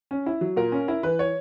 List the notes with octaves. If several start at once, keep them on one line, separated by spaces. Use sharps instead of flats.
C#4
E4
F#3
A#2 A#4
C#4
E4
E3 B4
C#5